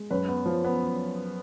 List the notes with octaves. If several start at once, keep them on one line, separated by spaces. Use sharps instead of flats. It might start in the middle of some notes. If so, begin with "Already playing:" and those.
Already playing: G#3
F#2 B4
B3
F3
B3